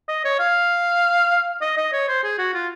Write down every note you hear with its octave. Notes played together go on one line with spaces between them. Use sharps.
D#5
C#5
F5
D#5
D#5
C#5
C5
G#4
F#4
F4